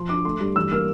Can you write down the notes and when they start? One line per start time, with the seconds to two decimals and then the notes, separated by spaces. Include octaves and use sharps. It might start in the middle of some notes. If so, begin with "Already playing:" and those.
Already playing: F3 C6
0.09 D3 D6
0.25 A3 C6
0.40 G2
0.56 E3 E6
0.71 A#3 F6